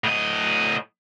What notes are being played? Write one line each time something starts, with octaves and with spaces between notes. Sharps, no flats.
A2 D#5